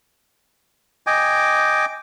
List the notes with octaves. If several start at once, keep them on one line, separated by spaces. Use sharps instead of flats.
D#5 G5 G#5 D6